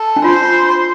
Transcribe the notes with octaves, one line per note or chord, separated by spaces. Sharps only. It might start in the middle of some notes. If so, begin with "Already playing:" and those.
Already playing: A4
D4
F4 C5